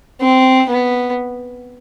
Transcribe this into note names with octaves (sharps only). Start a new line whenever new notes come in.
C4
B3